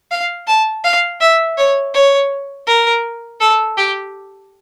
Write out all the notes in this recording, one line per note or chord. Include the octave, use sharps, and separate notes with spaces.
F5
A5
F5
E5
C#5
C#5
A#4
A4
G4